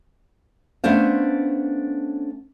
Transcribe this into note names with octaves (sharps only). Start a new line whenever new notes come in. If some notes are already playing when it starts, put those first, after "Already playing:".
A3 B3 C#4 D4 C5 F5